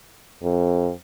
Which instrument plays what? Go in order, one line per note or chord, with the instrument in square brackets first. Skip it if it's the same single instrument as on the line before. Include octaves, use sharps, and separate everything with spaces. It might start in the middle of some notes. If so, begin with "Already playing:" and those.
[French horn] F2